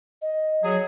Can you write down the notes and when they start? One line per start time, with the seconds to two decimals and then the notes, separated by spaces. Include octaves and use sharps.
0.22 D#5
0.64 F#3 G#4